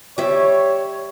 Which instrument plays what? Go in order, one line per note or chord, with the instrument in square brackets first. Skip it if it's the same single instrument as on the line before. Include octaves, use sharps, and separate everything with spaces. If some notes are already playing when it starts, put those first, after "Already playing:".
[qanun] G3 E5 [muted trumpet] C#5